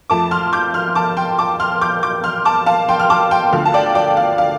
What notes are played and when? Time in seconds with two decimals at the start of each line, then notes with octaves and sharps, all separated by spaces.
0.10 F2 F3 A3 A5 D6
0.31 C6 F6
0.53 D6 G6
0.74 C6 F6
0.95 A5 D6
1.17 G5 C6
1.39 A5 D6
1.60 C6 F6
1.81 D6 G6
2.03 D6 G6
2.24 C6 F6
2.45 A5 D6
2.66 F5 A5
2.89 G5 C6
3.00 F6
3.10 A5 D6
3.31 G5 C6
3.52 D2 D3 F3 F5
3.66 A5
3.74 D5 G5
3.95 D5 G5
4.17 F5
4.38 F5